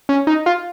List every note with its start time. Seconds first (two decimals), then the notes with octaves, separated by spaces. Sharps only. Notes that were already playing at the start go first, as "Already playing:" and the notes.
0.09 C#4
0.27 D#4
0.46 F4